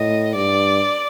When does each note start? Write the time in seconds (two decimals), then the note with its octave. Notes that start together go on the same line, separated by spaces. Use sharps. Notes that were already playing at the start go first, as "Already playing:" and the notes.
Already playing: A2 D#5
0.36 G2 D5